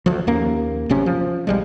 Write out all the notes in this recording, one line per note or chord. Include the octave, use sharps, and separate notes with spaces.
D2 F3
D#2 A#3 C#4
F#1 F#2 C3 C#4
F3
B1 G3 G#3